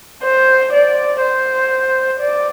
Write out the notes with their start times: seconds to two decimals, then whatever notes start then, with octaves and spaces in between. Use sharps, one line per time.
0.24 C5
0.74 D5
1.22 C5
2.21 D5